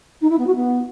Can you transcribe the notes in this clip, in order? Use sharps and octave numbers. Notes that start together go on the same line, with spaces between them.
D#4
E4
B3
F#4
B3